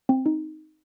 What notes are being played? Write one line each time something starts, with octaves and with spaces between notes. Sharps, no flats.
C4
D#4